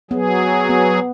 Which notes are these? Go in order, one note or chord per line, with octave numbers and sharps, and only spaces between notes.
F#3 B3 G#4
B3